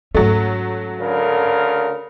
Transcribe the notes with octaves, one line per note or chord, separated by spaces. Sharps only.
G#2 F#3 A3 C#4
D2 C#3 A#4